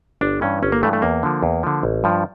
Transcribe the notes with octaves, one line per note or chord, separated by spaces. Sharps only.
G1 D4
G2 E3 C#4
G1 C#4
A#3
G2 E3 A3
A3
E2 A#3
D3 F3
E2
D3 F3
A1
G2 F3